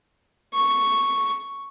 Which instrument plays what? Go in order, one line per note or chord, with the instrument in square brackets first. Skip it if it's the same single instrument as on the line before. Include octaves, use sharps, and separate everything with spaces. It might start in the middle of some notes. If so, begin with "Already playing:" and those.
[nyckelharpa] C#6